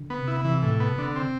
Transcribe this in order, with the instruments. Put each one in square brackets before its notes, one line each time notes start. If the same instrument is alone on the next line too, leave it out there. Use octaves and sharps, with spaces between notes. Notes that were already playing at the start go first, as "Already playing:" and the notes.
Already playing: [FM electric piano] D3
[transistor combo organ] B3
[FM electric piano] C3
[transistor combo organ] E4
[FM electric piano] C3 [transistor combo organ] E3
[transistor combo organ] A2
B3
D3
C4